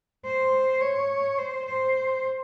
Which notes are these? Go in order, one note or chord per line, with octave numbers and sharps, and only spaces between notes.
C5
C#5
C5
C5